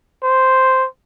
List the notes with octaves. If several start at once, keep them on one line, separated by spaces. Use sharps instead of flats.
C5